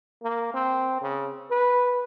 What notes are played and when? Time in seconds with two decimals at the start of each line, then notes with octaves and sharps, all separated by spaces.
0.23 A#3
0.54 C4
1.02 C#3
1.51 B4